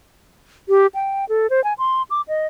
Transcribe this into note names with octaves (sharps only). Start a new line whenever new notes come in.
G4
G5
A4
C5
G#5
C6
D6
D#5